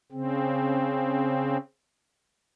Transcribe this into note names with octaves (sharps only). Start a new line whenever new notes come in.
C#3 C4